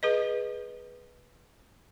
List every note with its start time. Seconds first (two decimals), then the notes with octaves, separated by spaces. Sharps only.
0.03 G#4 B4 D#5